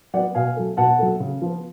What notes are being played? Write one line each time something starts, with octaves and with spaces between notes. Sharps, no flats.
F#3 B3 D5 F#5
B2 F5 G#5
F#3 A3
B2 F#5 A5
F#3 A3
C#3
F3 B3